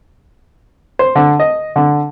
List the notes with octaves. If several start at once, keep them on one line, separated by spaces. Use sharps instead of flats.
C5
D3
D#5
D3